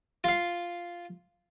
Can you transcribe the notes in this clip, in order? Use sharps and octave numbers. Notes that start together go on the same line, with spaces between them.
F4 F5